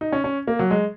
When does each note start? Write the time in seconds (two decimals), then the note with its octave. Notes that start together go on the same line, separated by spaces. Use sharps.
0.01 D#4
0.12 C#4
0.24 C#4
0.47 A#3
0.59 F#3
0.71 G#3